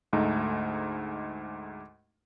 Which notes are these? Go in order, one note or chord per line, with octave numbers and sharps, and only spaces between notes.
D2 G#2 A3 D#4